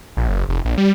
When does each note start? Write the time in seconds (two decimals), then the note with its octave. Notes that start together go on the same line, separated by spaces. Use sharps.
0.17 A#1
0.29 F#1
0.49 F1
0.65 A#1
0.78 G3